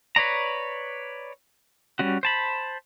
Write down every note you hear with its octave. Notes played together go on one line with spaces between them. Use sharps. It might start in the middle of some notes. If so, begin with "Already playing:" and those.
B4 C#5 D5 A#5
G3 C#4 F#4
C5 A5 B5